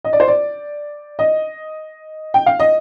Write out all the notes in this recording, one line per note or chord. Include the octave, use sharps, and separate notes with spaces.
D#5
D5
C5
D5
D#5
G5
F5
D#5